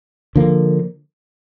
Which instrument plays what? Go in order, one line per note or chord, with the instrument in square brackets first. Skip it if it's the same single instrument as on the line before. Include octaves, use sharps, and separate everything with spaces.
[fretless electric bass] D3 F3 A#3